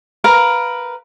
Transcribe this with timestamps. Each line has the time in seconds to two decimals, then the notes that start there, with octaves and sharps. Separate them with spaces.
0.24 A#4 B4 F5